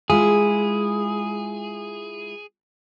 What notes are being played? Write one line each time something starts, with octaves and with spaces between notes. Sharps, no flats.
G#3 E4 F4 G#4